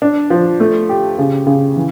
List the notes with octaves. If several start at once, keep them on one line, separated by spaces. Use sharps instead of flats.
D4
F3
A3
G4
C#3
C#3
E3